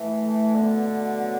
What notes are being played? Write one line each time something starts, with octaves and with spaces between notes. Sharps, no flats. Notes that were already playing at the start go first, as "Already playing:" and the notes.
Already playing: A2 E3
A3
B2 D3
B2
F#3